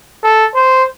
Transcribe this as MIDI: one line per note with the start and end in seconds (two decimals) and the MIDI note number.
0.23 0.46 69
0.55 0.84 72